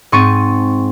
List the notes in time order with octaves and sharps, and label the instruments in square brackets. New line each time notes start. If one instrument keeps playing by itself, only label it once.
[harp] G#2 C4 C#6 A6 D#7